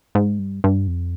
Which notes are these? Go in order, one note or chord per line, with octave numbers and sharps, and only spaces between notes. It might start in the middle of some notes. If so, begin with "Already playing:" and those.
G#2
G2
G2
F2